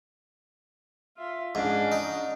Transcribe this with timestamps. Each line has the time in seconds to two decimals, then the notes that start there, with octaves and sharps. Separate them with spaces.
1.17 F4 E5
1.55 G#2 C#4 D4
1.92 D#4